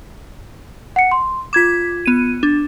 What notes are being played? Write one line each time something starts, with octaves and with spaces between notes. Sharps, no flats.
F#5 C#7
C6
F4 D6 G#6 B6 E7
B3 D#7
D4